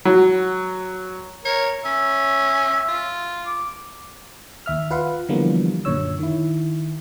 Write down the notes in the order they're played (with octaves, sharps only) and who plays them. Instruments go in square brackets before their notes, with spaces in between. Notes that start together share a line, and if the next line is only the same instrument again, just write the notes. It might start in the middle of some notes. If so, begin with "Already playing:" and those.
[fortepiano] F#3
[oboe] A#4 [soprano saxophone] C#5
[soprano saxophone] C#4 [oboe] E5
[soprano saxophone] F4
[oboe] D6
[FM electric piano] D#2 E5 F6
F4 B4 F5 F#5
D3 E3 F3 G3 A#3 B3
F#2 A#2 D3 C#5 E6
D#3 E4